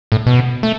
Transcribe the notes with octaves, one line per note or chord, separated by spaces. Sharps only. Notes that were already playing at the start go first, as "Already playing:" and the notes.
A2
B2
A3